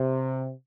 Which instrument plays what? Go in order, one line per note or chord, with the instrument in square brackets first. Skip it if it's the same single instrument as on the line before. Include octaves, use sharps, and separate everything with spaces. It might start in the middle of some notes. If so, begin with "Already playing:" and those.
Already playing: [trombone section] C3